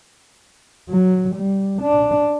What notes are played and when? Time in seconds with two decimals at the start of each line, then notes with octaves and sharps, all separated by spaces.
0.90 F#3
1.35 G3
1.82 D4